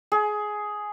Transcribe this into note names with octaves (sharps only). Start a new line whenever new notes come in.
G#4